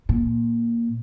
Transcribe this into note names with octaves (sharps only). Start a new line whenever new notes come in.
A#2